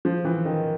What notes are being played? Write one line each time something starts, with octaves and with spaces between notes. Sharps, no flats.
F3
E3
D#3